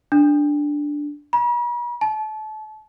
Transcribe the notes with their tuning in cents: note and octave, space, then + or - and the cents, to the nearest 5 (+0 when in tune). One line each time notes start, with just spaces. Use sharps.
D4 +0
B5 -45
A5 -30